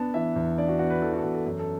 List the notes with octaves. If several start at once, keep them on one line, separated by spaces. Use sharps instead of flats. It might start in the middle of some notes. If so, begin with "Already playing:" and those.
Already playing: B3 D4 A5
E3 E5
E2
D4 D5
F#4
B3 F#4
B4
E3 A4
F#4
A4
E2 F#4
A4
F#2 A4
A4